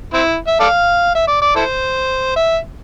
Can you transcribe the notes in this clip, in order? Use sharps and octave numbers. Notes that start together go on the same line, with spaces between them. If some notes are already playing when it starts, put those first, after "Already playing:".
C4 E4
E5
A4 D5 F5
E5
D5
D5
E4 A4 C5
E5